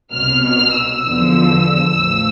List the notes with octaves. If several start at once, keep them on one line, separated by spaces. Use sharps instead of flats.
C2 B2 F6
F6
E6
E2 D3 F3
A1 A2 F3